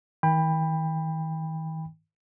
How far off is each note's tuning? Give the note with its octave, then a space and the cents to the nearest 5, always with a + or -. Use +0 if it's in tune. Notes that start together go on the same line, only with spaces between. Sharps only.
D#3 +40 G5 +30 B5 +0